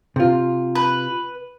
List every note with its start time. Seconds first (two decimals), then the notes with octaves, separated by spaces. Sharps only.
0.16 C3 F4
0.75 B4